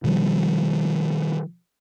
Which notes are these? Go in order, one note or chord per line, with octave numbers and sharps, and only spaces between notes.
B2 D#3 F3 G3